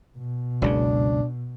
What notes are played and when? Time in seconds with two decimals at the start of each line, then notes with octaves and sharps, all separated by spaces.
0.17 B2
0.62 F#1 C#2 C#3 D4